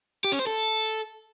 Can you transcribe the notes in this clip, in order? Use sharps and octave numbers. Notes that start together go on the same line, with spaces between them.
G4
C#4
C5
A4